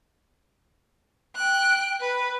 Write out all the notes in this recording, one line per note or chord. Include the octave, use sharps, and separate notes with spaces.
G5 F#6
B4